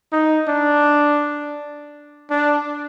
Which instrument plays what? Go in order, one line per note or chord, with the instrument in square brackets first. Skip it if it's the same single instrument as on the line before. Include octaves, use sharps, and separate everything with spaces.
[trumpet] D#4
D4
D4